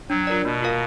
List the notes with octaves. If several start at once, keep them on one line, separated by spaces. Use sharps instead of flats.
F#3 D4
F4 A#4 D5
B2 A#3
F4 A#4 F5